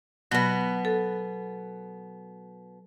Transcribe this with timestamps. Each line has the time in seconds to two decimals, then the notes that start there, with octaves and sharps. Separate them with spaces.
0.31 B2 F#3 B3 B5
0.85 A4